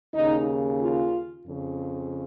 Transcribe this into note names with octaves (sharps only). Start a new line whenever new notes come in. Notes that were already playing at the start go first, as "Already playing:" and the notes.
D#2 C#3 D#4
F4
F2 C#3